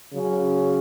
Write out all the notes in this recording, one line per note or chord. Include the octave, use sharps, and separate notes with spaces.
C#3 F#3 C#4